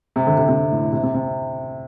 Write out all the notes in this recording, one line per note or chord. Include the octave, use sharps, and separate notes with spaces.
C3
D3
C3
C3
A2
C3
C3
C3